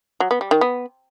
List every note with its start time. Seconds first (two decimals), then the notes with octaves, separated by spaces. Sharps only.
0.20 F#3
0.31 B3
0.41 G3
0.51 D#3
0.61 B3